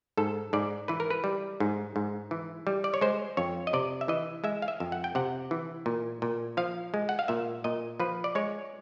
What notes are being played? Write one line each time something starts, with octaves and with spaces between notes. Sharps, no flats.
G#2 A4
G#2 D5
E3 B4
A#4
B4
G3
G#2
G#2
E3
G3
D5
C#5
G#3 C5
F2 C#5
D#5
C3 D5
E5
E3 D#5
G#3 E5
F5
E5
F2
F#5
G5
C3 F#5
E3
A#2
A#2
F3 F5
G#3
F#5
F5
A#2 E5
A#2 D#5
F3 B4
D5
G#3 C#5